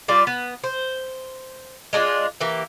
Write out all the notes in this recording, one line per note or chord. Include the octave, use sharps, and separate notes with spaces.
G3 F4 D5
B3
C5
G#3 A3 D4 F4
E3 A#3 G4